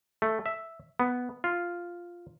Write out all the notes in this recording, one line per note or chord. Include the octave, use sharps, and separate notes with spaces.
A3
E5
B3
F4